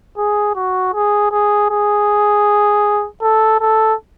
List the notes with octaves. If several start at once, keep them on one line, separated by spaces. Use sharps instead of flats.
G#4
F#4
G#4
G#4
G#4
A4
A4